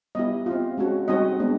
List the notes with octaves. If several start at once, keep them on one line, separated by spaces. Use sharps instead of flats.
G3 B3 E4 G4 D#5
C4 F4
G#3 C#4 F#4
G3 C4 D#4 F#4 D#5
G#3 B3 D4